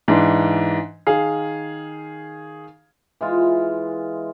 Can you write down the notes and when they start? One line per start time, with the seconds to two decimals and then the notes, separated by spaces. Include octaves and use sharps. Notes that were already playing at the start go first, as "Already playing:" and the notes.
0.08 G#2 E3 D4
1.07 D#3 G#4 F5
3.21 E3 G#3 F4